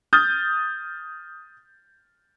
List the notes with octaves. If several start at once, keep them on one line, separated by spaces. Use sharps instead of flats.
D#6 F6 G6 A6